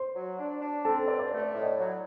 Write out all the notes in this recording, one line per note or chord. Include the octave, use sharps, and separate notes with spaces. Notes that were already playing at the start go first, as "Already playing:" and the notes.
Already playing: C5 C6
F#3
D4
D4
C4 A4 A5
C5
G2 D5
D5
A3 D5
D5
A2 D5
D#5
D5
F#3